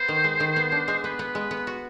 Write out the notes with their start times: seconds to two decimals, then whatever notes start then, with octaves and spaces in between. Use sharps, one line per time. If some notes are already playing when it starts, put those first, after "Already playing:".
Already playing: B3 C5
0.08 D#3
0.24 G#3
0.40 D#3
0.56 B3
0.72 D4
0.88 G#3
1.04 B3 B4
1.19 B3
1.35 G#3
1.51 B3
1.67 F#4